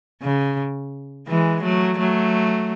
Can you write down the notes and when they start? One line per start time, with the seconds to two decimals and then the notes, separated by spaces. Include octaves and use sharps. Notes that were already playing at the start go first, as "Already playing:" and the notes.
0.22 C#3
1.28 E3 G#3
1.63 F#3 A3
1.98 F#3 A3